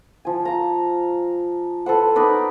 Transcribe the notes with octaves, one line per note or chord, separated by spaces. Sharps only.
F3 G#5
F5 A#5
A4 B4 C5 F#5
D#4 A#4 B4 D5